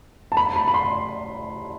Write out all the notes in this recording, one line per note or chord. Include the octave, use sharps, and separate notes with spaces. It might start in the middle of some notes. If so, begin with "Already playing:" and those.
A5
B5
B5
B5
C6